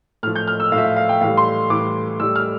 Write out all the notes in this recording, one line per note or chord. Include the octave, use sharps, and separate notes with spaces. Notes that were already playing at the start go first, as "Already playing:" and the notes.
A2 F3 F6
G6
F6
E6
A2 F3 E5 F5
F5
F5
G5
A2 E3 G3 F5
C6
A2 E3 G3 D6
A2 G3 E6
F6